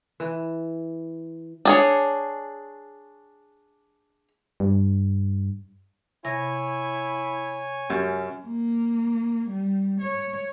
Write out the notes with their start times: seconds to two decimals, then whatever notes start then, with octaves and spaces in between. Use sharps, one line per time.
0.20 E3
1.65 D4 G#4 C#5
4.60 G2
6.25 C3 E4 C#5 E5 G#5 A#6
7.90 F#2 C#4 G4
8.47 A#3
9.50 G3
10.01 C#5